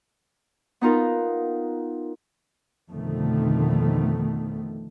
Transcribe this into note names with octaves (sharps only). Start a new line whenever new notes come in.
B3 D#4 F4 A#4
F2 B2 D3 D#3 A3